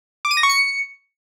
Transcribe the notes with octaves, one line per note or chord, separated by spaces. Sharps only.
D6
D#7
A#6
C#6
C#7